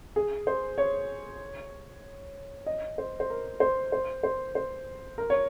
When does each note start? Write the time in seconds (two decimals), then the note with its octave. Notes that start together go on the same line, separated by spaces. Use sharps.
0.16 G#4
0.47 C5
0.78 C#5
2.66 D#5
2.98 C5
3.20 C5
3.30 A#4
3.60 C5
3.92 C5
4.23 C5
4.55 C5
5.18 A#4
5.30 C#5